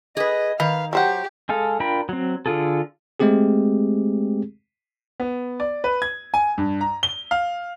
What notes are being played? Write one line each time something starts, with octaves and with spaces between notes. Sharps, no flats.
G#4 B4 D#5
D#3 B4 F5
F#3 G4 C5 F#5
G#3 G#4 A4 F5
D4 F4 A#4 G5 B5
F#3 C4
D3 F4 G#4 A4
G#3 A3 C4 G4 G#4
B3
D5
B4
G#6
G#5
G2
A#5
G7
F5